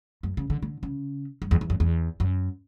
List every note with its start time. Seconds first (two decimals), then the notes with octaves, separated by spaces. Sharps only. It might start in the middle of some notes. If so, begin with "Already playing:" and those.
0.23 F#2
0.37 C#3
0.50 D3
0.62 D3
0.83 C#3
1.42 G2
1.51 E2
1.61 E2
1.70 F#2
1.80 E2
2.20 F#2